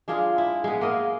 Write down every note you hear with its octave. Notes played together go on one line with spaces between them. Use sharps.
G#3 D4 F4 G#4
E4
G#3 B3
A#3 A#4 D#5